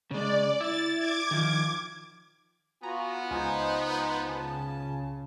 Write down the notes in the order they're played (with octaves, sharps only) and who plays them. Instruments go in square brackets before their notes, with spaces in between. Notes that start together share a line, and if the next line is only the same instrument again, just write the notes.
[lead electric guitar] C#3 G#3 [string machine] D5
[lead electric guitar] E4 [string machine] A6
[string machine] D6 G#6
[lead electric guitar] D#3 F3
[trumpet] B3 [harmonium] F4 F#4 G#5 [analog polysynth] A#5
[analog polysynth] C#2 F4 G#5 [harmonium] D#4 C5 D#5
[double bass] C#3 [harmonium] A5